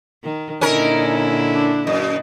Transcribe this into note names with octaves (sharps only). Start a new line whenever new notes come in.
D#3
A#2 D3 C#4 D#4 E4 A#4
D4
F#2 D#5